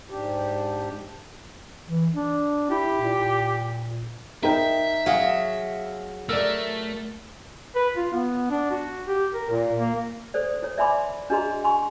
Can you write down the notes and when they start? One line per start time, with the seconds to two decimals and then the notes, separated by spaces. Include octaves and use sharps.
0.10 G#2 D4 G4
1.87 E3
2.13 D4
2.70 E4 G4
3.02 A#2
4.43 D#4 A#4 E5 G5
5.06 F#3 G#4 F5
6.29 A3 A#4 D5 E6
7.75 B4
7.96 F4
8.13 B3
8.50 D4
8.71 F#4
9.07 G4
9.33 A#4
9.50 A#2
9.78 A#3
10.34 A4 C5 D5
10.62 E4 C#5
10.77 D5 E5 G#5 B5 C6 D6
11.30 D4 F#4 G#4 D#5 A#5 C6
11.64 G#5 C6 C#6